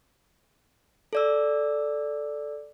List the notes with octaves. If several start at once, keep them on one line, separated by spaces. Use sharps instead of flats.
A4 D5 E6